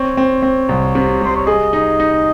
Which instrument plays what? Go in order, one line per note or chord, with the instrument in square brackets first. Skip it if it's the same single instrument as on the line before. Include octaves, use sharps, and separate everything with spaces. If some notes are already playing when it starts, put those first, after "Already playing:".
Already playing: [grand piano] C4 [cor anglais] C#5
[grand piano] C4
C4
C2
C3
[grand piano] G3 [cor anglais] C5
[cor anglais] C#5
[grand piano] G#4 [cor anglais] D#5
[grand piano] D#4
D#4